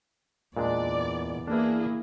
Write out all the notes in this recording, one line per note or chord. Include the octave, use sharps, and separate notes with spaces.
E2 A#2 G#3 D4 D5
E3 A#3 D4 E4 G#4